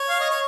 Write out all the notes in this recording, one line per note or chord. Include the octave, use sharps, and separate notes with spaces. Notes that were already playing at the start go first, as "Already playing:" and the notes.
Already playing: C#5
F5
D#5
C#5